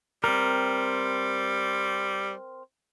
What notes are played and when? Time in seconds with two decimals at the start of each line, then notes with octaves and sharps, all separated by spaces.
0.24 G3 C4 A#4